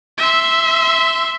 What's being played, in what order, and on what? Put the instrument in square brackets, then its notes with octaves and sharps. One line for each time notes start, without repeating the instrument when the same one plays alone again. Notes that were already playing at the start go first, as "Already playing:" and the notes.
[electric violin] E5 C6